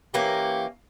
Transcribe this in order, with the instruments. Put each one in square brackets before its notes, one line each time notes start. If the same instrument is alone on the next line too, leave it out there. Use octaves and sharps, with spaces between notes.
[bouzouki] E3 A#3 C#4 [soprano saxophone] G4